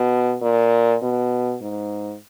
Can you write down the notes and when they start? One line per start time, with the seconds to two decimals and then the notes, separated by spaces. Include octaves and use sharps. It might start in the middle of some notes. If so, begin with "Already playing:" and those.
Already playing: B2
0.41 A#2
1.02 B2
1.61 G#2